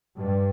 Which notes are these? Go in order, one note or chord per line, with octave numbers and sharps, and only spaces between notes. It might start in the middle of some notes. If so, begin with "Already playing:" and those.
G2